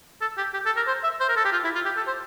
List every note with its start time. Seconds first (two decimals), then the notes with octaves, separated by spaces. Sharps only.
0.21 A4
0.38 G4
0.54 G4
0.66 A4
0.76 A#4
0.88 C5
1.04 E5
1.20 C5
1.29 A#4
1.37 A4
1.45 G4
1.52 F4
1.64 E4
1.75 F4
1.85 G4
1.97 A4
2.07 C5